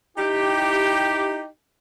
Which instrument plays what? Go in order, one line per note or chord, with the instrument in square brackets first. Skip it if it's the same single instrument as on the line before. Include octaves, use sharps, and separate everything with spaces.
[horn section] D#4 E4 G4